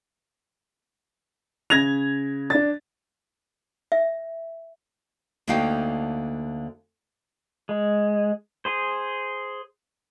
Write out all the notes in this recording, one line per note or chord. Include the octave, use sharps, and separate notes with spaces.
C#3 G#6 A#6 F7
D4 A6
E5
D2 D3 A#3 D#4 F5 G5
G#3
G#4 C5